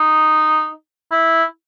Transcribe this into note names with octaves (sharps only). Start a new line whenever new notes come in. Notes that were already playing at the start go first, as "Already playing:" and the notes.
Already playing: D#4
E4